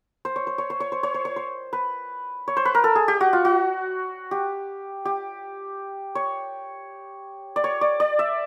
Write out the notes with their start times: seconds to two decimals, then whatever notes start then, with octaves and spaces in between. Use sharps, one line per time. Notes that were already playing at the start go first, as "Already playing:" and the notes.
0.25 C5
0.36 C#5
0.47 C5
0.58 C#5
0.70 C5
0.80 C#5
0.92 C5
1.03 C#5
1.14 C5
1.25 C#5
1.36 C5
1.73 B4
2.48 C#5
2.57 C5
2.65 B4
2.75 A#4
2.84 A4
2.95 G#4
3.08 G4
3.21 F#4
3.33 F4
3.45 F#4
4.31 G4
5.05 G4
6.15 C#5
7.56 D5
7.64 C#5
7.81 D5
8.00 D5
8.19 E5